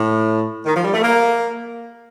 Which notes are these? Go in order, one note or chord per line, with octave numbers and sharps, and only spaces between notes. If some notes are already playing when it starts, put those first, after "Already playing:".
Already playing: A2
D#3
F3
G3
A3
A#3